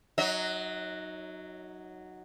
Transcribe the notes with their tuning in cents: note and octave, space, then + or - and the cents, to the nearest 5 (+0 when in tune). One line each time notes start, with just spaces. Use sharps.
F#3 +0 D#4 +0 E5 -45